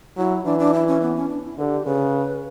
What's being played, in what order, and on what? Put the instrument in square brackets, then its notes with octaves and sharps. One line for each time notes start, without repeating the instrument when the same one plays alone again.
[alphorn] F#3 [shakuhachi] E4
[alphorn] E3 [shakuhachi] D4
[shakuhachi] D4
E4
C#4
B3
C#4
D4
E4
[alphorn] D3 [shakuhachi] B4
[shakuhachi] G4
[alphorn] C#3 [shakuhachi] B4